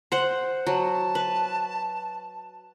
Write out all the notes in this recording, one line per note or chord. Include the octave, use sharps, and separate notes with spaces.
C5 F#5
F#3 A5
B4